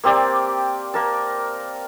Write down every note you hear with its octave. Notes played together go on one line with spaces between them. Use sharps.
A#3 C4 G4 D5
A#3 A#4 A5